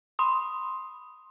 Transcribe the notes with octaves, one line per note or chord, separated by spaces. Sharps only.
B5 C6 D#6